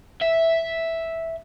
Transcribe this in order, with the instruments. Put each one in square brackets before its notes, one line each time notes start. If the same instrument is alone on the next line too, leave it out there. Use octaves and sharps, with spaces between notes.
[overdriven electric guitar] E5